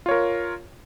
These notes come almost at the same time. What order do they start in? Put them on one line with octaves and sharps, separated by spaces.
F4 C#5 A#4